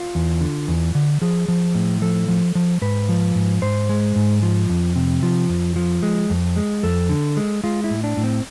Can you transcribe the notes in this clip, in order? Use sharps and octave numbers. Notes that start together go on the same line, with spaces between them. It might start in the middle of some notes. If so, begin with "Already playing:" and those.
Already playing: F4
E2
D3
E2
D3
F3 G#4
F3
A2
F3 A4
F3
F3
G#2 B4
F3
G#2
G#2 C5
G#3
G#2
F3
F2
C3
F3
F2
F3
G#3
F2
G#3
F2 A4
D3
G#3
G#3 F4
E4
A2
D4
A2
C4